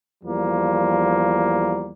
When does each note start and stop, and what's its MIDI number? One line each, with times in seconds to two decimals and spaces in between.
0.24 1.93 40
0.24 1.93 53
0.24 1.93 55
0.24 1.93 58